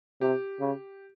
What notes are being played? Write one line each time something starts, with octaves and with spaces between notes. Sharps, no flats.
C3 G4
C#3